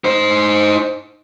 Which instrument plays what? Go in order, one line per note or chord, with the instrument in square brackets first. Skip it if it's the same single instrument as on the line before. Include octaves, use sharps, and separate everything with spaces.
[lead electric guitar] D#4 C5